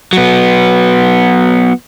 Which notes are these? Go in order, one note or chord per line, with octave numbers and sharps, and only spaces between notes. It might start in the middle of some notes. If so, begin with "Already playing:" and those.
F#3 B3